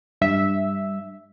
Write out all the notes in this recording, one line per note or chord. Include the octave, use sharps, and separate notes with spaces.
G2 E5